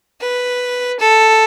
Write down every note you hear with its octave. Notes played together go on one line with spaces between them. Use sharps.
B4
A4